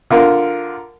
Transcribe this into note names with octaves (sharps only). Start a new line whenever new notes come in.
D3 F4 A#4